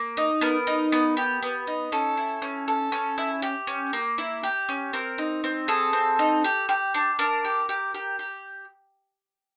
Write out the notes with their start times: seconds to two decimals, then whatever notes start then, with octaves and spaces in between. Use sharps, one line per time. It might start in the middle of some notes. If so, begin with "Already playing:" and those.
Already playing: A#3
0.17 D#4
0.41 B3 A#4
0.67 D#4
0.92 B3
1.17 G4
1.43 B3
1.67 D#4
1.92 C#4 A4
2.17 E4
2.42 C#4
2.68 A4
2.92 C#4
3.18 E4
3.42 G4
3.67 C#4
3.93 A#3
4.18 E4
4.43 G4
4.69 C#4
4.93 C4 A#4
5.18 D#4
5.44 C4
5.68 G#4 A4
5.93 C4
6.19 D#4
6.44 G4
6.69 G4
6.94 D4
7.19 D4 A#4
7.45 G4
7.69 G4
7.94 G4
8.19 G4